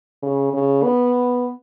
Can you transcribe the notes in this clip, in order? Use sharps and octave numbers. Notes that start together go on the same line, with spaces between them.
C#3
C#3
B3